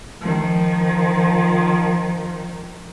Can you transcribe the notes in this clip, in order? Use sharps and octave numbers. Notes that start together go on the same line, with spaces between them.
D#3 F3